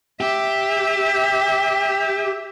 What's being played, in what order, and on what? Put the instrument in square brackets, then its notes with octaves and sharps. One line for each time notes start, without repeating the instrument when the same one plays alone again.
[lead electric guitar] G4 [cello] E5